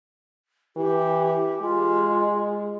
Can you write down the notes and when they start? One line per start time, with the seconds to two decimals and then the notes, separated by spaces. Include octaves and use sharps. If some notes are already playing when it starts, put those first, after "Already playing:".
0.76 E3 G4
1.62 G#3 F4